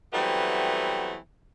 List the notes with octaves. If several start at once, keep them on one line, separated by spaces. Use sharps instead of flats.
E3 F#3 G3 A3 B3 C4